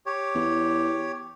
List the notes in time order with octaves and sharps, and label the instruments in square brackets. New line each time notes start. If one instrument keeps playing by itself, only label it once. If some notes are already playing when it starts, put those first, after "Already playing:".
[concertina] G4 C#5
[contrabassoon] E2